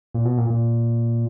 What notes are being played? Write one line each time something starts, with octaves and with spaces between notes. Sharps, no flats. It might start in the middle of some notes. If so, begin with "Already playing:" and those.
A#2
B2
A#2
A#2